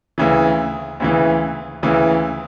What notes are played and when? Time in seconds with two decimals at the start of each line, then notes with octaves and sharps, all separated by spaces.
0.18 D2 C#3 E3
1.00 D2 C#3 E3
1.83 D2 C#3 E3